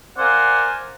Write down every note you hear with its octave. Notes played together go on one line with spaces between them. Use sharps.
A#4 C5 D5 F5 F#5 G#5